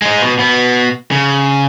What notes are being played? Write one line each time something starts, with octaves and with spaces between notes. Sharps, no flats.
G#3 D#4
B2
B2 B3
C#3